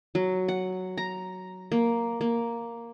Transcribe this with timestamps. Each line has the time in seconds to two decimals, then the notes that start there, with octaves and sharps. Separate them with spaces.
0.15 F#3
0.48 F#5
0.97 A#5
1.72 A#3
2.21 A#3